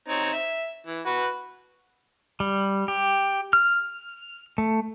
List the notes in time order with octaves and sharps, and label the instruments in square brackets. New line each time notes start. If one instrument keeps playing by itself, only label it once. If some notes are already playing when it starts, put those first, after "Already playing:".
[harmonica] C4 D#4 C#5
E5
E3
F#4 B4
[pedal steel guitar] G3
G4
F6
A3